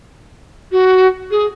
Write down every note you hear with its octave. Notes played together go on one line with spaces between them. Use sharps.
F#4
G#4